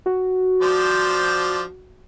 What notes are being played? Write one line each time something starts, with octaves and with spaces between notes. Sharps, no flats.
F#4
F3 D4 C5